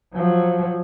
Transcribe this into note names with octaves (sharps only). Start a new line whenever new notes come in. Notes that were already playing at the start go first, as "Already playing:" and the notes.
F3 F#3